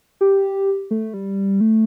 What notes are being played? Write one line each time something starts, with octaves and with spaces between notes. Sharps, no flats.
G4
A3
G3
A3